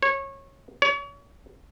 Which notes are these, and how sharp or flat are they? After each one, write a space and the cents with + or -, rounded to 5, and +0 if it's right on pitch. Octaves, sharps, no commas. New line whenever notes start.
C#5 -20
C#5 +35